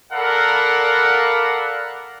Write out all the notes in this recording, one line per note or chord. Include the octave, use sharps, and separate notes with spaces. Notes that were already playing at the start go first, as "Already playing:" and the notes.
A4 A#4 D5 F5 F#5 B5